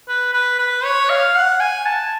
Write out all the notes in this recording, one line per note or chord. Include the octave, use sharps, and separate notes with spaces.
B4
B4
B4
C#5
F5
F#5
G#5
A5